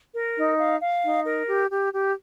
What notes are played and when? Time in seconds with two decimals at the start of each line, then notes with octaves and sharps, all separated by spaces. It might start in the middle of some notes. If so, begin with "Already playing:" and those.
0.15 A#4
0.37 D#4
0.59 F5
0.81 F5
1.04 D#4
1.26 A#4
1.47 G4
1.70 G4
1.93 G4